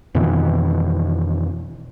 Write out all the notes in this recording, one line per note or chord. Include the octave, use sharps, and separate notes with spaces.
F2 B2 D#3 E3